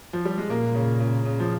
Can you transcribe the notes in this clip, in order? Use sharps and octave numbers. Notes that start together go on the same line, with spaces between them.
F3
G3
G#3
A#2 A#3
C#3
C#3
C#3
F3